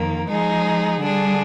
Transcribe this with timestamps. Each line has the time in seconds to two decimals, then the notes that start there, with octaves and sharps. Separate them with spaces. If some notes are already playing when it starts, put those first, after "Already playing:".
Already playing: F2 D#3 A#3
0.28 F3 G#3 D#4 G#4
1.01 D3 G3 D4 G#4